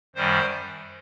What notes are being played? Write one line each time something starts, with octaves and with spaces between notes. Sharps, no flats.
F#2 D#3 G3 C5